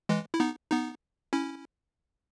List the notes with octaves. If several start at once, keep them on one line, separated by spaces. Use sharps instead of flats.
E3 G#3
E4
B3 D#4
B3 D#4
C#4 E4